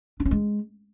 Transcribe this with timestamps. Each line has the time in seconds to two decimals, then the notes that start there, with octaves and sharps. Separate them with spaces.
0.20 D4
0.25 C#4
0.31 G#3